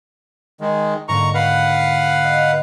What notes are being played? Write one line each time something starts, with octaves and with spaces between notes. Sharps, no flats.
D#3 G#3
G#2 D3 A#3 A#5 C#6
B4 F5 F#5
D#5